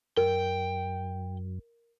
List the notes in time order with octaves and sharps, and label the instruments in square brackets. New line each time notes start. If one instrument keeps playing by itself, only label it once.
[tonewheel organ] F#2 [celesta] A#4 [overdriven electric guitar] G5